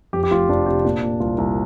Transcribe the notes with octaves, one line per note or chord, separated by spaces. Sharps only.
F2 G4
G4
F1 F4
F1 D4
C3 G4
A#2 D4
A#2
C2 F4
C2